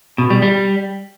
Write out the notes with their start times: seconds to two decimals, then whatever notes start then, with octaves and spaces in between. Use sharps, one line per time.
0.18 B2
0.30 G3
0.42 G3